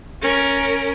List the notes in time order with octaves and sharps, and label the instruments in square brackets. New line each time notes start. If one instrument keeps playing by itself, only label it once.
[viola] C#4 A#4